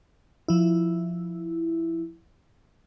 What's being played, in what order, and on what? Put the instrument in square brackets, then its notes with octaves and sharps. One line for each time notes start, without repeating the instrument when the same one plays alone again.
[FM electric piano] F3 E4